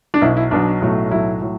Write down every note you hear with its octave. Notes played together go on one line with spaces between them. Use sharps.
D4
B1 B2 F#3 E4
E4
B1 B2 F#3 D4
B1 A2 F#3 A3
B1 A2 F#3 A3 E4
A2 F#3